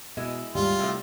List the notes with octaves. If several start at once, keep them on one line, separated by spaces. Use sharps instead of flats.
B2 G#3 E4
D#2 G#2 G3 F4
A2 C3 A3